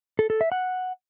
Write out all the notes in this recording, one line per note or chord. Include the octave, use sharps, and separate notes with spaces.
A4
A4
E5
F#5